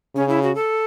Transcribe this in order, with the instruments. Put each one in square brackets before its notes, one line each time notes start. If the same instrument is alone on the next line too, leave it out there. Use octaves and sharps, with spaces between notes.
[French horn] C#3 [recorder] C#4
[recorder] E4
F#4
A4